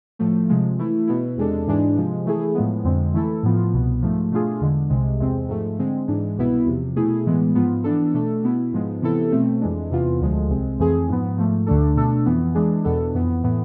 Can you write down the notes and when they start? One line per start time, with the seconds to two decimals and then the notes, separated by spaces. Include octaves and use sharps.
0.19 A2 F3 A3
0.49 C3 F3 G#3
0.79 E3 A3 E4
1.07 B2 B3 E4
1.37 E2 C3 G#3 D4 A4
1.67 G#2 E3 G#3 D4 G#4
1.96 C3 F3 G#3
2.25 E3 A3 E4 G#4
2.55 A2 F3 G#3 B3
2.84 F2 D3 G#3 C4
3.14 E3 A3 E4 A4
3.43 A2 F3 B3 F4
3.73 C2 B2 B3
4.02 G#2 F3 A3
4.31 B2 A3 D4 F4 G#4
4.61 E2 D3 G#3
4.90 C2 C3 G#3
5.20 E2 C3 G#3 C4
5.49 G#2 F3 A3
5.79 D3 G#3 C4
6.08 G#2 E3 G#3 D4
6.37 C2 B2 B3 E4
6.66 E2 C3 F3
6.96 B2 A3 E4 G#4
7.26 A2 E3 G#3 B3
7.55 G#2 F3 B3 F4
7.84 E3 B3 D4 A4
8.14 B2 A3 D4 A4
8.44 B2 B3 E4
8.73 G#2 F3 G#3 B3
9.02 C3 E3 B3 E4 A4
9.31 B2 A3 C4
9.61 F2 E3 G#3 D4
9.90 E2 C3 E3 B3 F4
10.20 D2 D3 F3 G#3
10.49 C2 C3 G#3 C4
10.79 F2 E3 A3 C4 G#4
11.09 G#2 F3 B3
11.37 G#2 F3 A3
11.66 D2 D3 A3 D4 A4
11.96 B2 A3 D4 A4
12.26 F2 E3 B3
12.55 E3 G#3 D4 G#4
12.84 E2 B2 B3 D4 A4
13.14 F2 E3 B3
13.43 A2 E3 B3